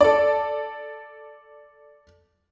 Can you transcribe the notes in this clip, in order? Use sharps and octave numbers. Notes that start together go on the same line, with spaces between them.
A4 D5